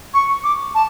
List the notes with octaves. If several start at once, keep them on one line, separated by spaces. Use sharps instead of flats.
C#6
D6
A5